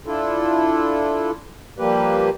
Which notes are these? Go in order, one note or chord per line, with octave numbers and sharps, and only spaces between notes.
D4 E4 F4 A4
F3 G3 A#3 G4 B4